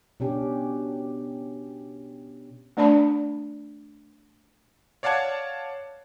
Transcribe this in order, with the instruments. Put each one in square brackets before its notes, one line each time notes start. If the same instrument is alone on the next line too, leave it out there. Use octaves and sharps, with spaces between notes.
[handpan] B2 C#4 D4 G4
[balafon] A3 D4 D5 A5 B5
[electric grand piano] C#5 D5 F5 F#5 A5 G#6